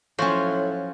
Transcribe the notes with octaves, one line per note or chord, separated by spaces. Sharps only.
A2 F3 F#3 C#4 C5 C6 C#6